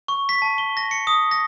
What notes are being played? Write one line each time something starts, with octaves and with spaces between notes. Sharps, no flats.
C#6
B6
A5
G7
A#6
C#7
D#6
A#6